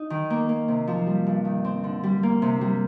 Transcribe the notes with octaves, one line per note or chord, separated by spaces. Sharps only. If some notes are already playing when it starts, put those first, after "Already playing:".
Already playing: D#4
D#3
A#3
A#3
C3
F3
G3
G2
D#3
C4
D3
G3
A#3
C3
G3